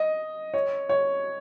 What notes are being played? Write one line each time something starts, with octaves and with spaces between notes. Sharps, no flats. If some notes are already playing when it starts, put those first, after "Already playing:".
Already playing: D#5
C#5
C#5